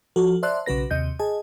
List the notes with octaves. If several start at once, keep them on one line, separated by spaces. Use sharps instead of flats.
F3 F#4 A4
C5 D5 E5 A5 C6 F#6
B1 C#3 F#4 B4 A#6
D#2 C3 D#5 G6
G#4 D#5 G#5 A5